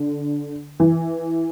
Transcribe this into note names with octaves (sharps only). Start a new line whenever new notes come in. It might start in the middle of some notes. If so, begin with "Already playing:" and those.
Already playing: D3
E3